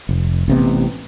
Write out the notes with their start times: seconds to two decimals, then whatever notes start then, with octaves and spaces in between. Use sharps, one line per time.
0.09 F1
0.48 A1 C3 B3